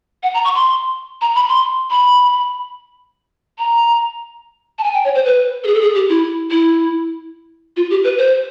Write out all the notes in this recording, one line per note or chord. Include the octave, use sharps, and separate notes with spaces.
F#5
A#5
C#6
C6
A#5
B5
C6
B5
A#5
A5
G#5
G5
C#5
C5
B4
A4
G#4
A4
G#4
G4
E4
E4
F4
G4
B4
C5